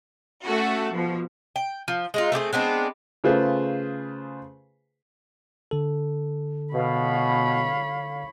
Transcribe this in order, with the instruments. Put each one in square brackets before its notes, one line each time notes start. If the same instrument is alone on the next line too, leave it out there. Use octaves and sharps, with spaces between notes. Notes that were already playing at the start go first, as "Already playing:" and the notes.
[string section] A3 C#4 F#4 A4
B2 F3
[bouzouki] G5
F3
G#3 D#4 F4
A3 C4 G4 G#4
G#3 B3 C4 D4
[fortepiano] C#3 A3 F4 G#4 B4 C5
[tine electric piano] D3 A4
[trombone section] B2 [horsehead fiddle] C#5 B5 [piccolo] F5